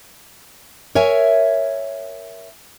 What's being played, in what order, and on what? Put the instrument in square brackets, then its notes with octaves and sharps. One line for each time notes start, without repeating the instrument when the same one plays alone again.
[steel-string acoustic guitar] A#4 C#5 E5 G#5